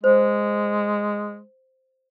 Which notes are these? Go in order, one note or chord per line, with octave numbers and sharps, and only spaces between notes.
G#3 C5